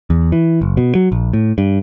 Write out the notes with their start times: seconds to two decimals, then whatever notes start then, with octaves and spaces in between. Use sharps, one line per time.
0.10 E2
0.32 E3
0.62 F#1
0.77 B2
0.95 F#3
1.12 A#1
1.33 A2
1.58 G2